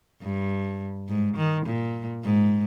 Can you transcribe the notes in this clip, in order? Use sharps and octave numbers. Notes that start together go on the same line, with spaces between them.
G2
G#2
D#3
A#2
G#2